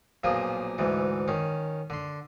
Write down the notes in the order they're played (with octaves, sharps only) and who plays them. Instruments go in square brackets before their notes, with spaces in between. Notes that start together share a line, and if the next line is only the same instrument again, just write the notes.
[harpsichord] B1 A#2 F3 A#3 G#4
D2 G#2 E3
D#3 C#4
D3 C6